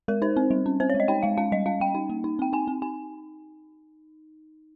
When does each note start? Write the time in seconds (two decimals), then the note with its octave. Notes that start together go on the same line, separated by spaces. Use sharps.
0.08 G#3 A#4
0.22 D#4 C5
0.36 C4
0.51 G3
0.66 C#4
0.80 C4 C5
0.90 C#5
0.94 G#3
1.00 D#5
1.08 D#4 G5
1.23 G#3 F5
1.37 C#4 F5
1.52 G3 D#5
1.66 C#4 F5
1.80 G3 G5
1.95 D#4
2.09 A#3
2.24 D#4
2.39 C4 G5
2.53 D#4 G#5
2.67 C4
2.82 D#4 G#5